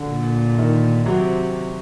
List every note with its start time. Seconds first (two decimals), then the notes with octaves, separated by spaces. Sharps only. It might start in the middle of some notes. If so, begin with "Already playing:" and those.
Already playing: D3
0.09 A#2
0.58 D#3
1.06 C3 F#3